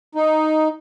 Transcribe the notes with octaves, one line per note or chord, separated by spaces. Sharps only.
D#4